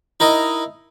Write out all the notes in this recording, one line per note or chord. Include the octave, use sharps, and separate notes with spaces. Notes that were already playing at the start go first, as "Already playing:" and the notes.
D#4 E4 A#4 D#5